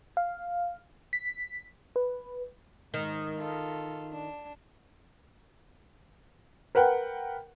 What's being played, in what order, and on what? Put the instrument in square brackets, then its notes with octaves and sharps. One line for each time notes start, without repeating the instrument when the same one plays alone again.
[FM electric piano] F5
B6
B4
[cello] G#2 [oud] D#3
[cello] F4 A4
D4
[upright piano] A#4 B4 F#5 G5